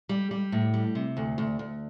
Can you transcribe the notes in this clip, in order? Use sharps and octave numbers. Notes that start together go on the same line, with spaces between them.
G3
G3
A2
G3
C3
D2
D2
D2